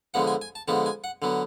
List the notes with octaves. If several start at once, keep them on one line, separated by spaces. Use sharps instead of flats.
D3 F3 G#3 B3 F#5
G#5
G#5
A5
D3 F3 G#3 B3 A5
G#5
F#5
D3 F#3 B3